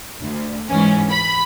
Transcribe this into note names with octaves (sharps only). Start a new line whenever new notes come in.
D2
G#2 E3 C#4
B5